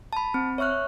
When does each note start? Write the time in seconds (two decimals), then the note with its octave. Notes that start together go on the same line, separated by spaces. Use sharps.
0.13 A5 B5
0.34 C4
0.58 C#5 E5 C#6 F6 F#6